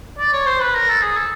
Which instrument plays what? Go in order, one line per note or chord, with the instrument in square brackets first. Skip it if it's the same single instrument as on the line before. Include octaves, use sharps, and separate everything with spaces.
[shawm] D5
C#5
C5
B4
A#4
A4
G#4
A4